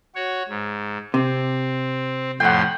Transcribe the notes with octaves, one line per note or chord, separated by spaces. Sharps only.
F#4 C#5
G#2
C3 C4
F2 A2 F#5 G5 C6